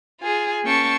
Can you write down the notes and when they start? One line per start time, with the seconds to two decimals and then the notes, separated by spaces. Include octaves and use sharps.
0.21 F4 G#4
0.64 A#3 C#4 F5 G5 A5 C#6